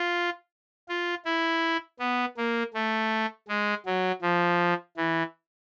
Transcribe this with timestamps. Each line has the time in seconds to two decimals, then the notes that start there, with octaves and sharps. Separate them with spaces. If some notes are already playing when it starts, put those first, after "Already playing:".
Already playing: F4
0.88 F4
1.25 E4
1.99 B3
2.37 A#3
2.74 A3
3.48 G#3
3.86 F#3
4.22 F3
4.97 E3